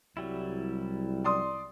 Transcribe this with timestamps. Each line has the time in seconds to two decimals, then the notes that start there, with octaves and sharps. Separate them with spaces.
0.17 C2 F#3 G3 E4
1.24 D5 C6 D#6